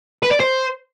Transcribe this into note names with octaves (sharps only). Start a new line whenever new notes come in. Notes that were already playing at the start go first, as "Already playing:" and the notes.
B4
D5
C5